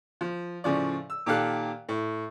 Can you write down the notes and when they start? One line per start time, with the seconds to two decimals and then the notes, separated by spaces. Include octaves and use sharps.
0.21 F3
0.64 A2 C#3 F3 D5
1.10 E6
1.26 A#2 D#3 G4 A4 F5 F#6
1.89 A2